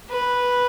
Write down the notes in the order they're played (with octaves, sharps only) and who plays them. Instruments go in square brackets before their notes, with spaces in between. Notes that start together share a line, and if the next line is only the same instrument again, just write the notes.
[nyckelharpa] B4